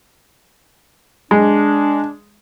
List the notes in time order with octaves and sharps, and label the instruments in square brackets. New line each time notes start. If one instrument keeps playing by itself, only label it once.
[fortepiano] G#3 [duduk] D4